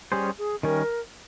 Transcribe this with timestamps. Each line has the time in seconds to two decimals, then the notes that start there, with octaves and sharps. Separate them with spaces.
0.12 G3 C#4 G4 G#4 C5
0.38 G#4
0.63 D#3 G3 C#4 A#4